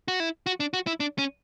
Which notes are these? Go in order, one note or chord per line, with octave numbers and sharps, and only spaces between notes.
F#4
E4
F#4
D4
F#4
E4
D4
C#4